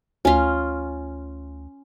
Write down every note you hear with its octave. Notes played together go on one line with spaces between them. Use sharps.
D2 C#4 F4